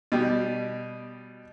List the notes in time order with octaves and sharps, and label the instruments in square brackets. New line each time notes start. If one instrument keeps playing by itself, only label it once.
[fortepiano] B2 G3